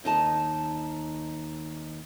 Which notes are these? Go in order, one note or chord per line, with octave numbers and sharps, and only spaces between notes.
D#2 D#4 G#5 A5